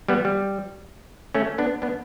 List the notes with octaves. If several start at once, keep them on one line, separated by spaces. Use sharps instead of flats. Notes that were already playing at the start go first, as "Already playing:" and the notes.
G3 B3
G3
A3 C#4
B3 D4
B3 D4